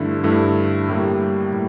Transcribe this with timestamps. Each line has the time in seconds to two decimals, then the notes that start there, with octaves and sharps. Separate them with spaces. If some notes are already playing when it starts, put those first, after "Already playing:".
Already playing: G2 D3 A3 E4
0.24 G2 D3 A3 E4
0.89 A2 G3 A#3
1.53 A2